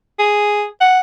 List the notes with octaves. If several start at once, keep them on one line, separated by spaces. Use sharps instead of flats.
G#4
F#5